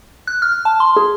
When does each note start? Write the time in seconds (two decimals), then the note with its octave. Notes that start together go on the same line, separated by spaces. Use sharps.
0.27 F#6
0.42 F6
0.65 A5
0.80 C6
0.97 G#4